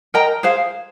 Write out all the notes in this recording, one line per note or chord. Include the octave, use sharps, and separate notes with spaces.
A#4 D#5 G5 A#5
G#4 C5 F5